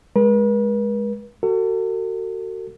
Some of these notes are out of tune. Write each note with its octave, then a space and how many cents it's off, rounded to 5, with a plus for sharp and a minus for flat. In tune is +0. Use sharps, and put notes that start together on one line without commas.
G#3 +0 B4 -45
F#4 +20 A4 +40